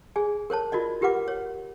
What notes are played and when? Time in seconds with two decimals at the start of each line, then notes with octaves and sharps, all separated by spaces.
0.16 G#4 D5 G#5
0.50 A#4 C5 C#5 A5
0.72 F4 F#4 A#4 D5 D#5
1.01 F4 G4 A#4 B4 F#5 D6
1.28 C#5